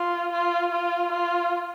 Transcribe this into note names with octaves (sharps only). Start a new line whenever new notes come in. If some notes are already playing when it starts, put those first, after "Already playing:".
Already playing: F4
F4
F4
F4